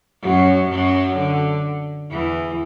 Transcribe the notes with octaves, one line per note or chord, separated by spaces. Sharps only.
F#2 F#3
F#2 F#3
D3
E2 E3